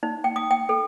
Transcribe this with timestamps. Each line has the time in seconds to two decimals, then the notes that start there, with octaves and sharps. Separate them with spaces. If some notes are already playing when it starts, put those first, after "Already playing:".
0.03 D#4
0.24 G5
0.36 D#6
0.51 G5
0.69 A4